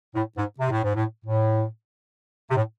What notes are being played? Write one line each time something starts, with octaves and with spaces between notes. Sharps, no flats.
A2
G#2
C3
A2
G#2
A2
A2
C3
A2